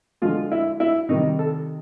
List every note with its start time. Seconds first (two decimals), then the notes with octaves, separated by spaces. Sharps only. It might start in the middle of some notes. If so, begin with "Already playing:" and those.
0.22 D3 F3 G#3 F4
0.52 E4
0.80 E4
1.09 C3 D#3 G3 D#4
1.39 A4